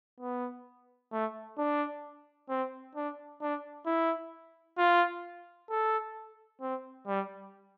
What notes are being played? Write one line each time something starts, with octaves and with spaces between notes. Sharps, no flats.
B3
A3
D4
C4
D4
D4
E4
F4
A4
C4
G3